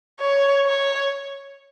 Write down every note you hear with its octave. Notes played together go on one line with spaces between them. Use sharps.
C#5
C#5